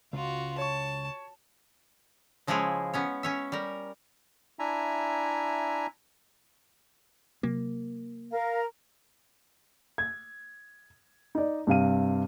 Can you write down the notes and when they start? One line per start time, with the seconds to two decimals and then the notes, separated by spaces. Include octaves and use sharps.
0.13 C#2 F4 F#4
0.58 C#5 A5 C#6
2.47 C#3 F3 G#3 E4 G#4 C#5
2.94 B3 C#4 C#5
3.23 C#4 C#5 E5
3.52 G3 A#4
4.59 D4 E4 E5 G#5 A#5
7.43 C3 F#3 A#3
8.32 A#4 F5
9.98 G#6
11.35 D#4 D5
11.67 G2 C3 F5 D#7